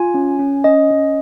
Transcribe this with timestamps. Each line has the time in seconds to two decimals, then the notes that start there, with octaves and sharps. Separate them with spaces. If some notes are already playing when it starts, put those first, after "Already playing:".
Already playing: F4 G#5
0.14 C#4
0.39 C#4
0.64 C#4 D#5
0.91 C#4